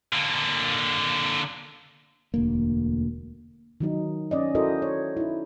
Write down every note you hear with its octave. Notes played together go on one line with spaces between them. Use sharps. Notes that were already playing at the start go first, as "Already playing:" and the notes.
D3 A#3
E1 D2 A#3
D#3 F#3 D#4
C#4 D5 D#5
E4 F#4 A4 A#4 C5 D#5
C#5
D#4 E4